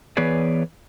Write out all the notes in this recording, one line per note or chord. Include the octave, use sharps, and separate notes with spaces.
E3 B3 G#4 B4 C#5 D5